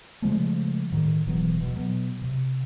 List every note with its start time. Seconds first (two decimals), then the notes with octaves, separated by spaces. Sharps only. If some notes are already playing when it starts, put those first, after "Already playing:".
0.22 C#3 F3 G#3 A3
0.92 A2 D#3
1.27 D#1 B2 E3 F#3
1.60 B2
1.75 B2 F#3
2.22 C3